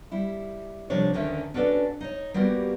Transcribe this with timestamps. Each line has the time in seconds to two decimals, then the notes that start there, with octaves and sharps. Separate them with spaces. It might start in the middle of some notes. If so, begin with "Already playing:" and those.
0.12 G3 E4
0.90 C3 F3 G3 D4 A#4 C#5
1.14 D2 D3 D#3 C#4 E5
1.54 C#4 D4 F#4 A4 B4 D5
2.01 D#4 C#5
2.34 G3 A#3 B3 F#4 G4